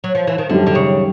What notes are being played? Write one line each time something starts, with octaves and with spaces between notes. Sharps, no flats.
F#3
F3
E3
D#3
F#2 D3 D#3 G3
D3
C#3